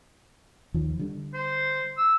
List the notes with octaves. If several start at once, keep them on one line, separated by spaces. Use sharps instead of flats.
D#2 D#3 F3
D3 G3
C5
E6